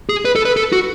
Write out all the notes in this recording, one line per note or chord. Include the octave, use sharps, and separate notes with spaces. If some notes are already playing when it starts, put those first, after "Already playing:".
G#4
B4
A4
B4
A4
F#4